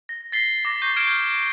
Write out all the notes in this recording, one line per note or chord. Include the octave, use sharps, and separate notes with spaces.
A#6
A6 B6 C7 G7
D6 A6 A#6
C#6 G6 C7
F6 G#6 C7 D7 E7